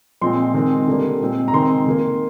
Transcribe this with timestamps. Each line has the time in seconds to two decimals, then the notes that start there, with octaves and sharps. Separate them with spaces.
0.21 A#2 F3 G#3 C4 C6
0.54 D#3 G#3 C4
0.88 D3 G3 A#3
1.20 A#2 G#3 C4
1.48 A#5
1.53 D#3 G#3 C4 C6
1.86 D#3 A#3